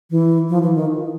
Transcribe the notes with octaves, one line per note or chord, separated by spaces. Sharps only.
E3
F3
E3
D#3